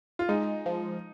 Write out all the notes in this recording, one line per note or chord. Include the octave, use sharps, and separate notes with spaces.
F4
G#3 D#4
F3